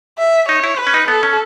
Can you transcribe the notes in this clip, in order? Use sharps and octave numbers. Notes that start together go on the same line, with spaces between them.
E5
D#4 C#5
E4
B4
C#4
D#4
B3 A4
C#4